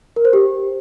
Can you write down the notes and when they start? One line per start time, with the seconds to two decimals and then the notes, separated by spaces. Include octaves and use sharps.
0.16 A#4
0.25 C5
0.33 G4